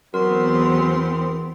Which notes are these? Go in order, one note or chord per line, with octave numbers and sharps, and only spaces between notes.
E2 F#3 B3 C4 A#4 C6